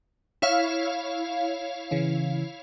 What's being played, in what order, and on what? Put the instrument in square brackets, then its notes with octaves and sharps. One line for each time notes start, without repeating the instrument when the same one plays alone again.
[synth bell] E4 C#5 F5
[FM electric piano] C#3 E3 C#4